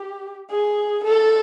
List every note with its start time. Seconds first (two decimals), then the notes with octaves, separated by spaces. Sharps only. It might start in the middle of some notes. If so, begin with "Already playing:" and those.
Already playing: G4
0.50 G#4
1.04 A4